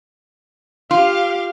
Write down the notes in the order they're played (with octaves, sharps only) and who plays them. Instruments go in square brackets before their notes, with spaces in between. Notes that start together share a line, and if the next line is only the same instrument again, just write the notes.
[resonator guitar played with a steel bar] F4 [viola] G4 F5